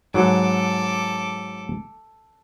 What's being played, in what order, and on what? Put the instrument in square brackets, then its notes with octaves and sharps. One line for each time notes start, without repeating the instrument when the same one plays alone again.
[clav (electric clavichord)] G#2 F#3 [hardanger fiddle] A4 D6